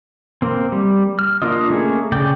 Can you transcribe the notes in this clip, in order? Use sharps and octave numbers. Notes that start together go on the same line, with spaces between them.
A#3 C4
G3
F6
A#3 D4 F4 D#5
A3 A#3 C#4 G#4
C#3 D5 G5